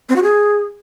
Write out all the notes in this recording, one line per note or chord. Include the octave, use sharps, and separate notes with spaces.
C4
F#4
G#4